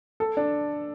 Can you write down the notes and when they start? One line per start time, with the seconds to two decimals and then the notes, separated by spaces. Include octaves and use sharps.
0.20 A4
0.37 D4